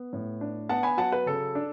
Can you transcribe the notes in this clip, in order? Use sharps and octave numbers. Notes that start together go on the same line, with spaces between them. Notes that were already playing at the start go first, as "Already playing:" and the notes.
Already playing: B3
A2
D4
B3 F#5 A5
G#5 B5
F#3 F#5 A5
B4
C#3 A4
D4